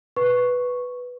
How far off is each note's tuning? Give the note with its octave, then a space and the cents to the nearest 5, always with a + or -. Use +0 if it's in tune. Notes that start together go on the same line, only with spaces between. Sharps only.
B4 +0 C#6 +0